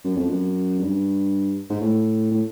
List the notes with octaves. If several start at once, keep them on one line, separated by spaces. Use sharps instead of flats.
F#2
F2
F#2
F#2
G2
G#2
A2
A2